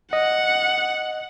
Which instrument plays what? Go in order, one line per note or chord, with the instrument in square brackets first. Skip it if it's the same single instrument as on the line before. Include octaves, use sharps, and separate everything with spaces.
[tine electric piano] D#5 [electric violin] F#5